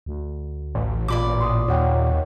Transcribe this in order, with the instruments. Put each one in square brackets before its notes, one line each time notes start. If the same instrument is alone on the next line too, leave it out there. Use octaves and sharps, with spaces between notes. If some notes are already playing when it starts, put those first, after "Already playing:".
[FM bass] D2
[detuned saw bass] A1
[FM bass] A#2 [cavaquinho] D5 B5 D6
[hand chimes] C6 D#6
[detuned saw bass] D#2 [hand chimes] C#5 F#5 G5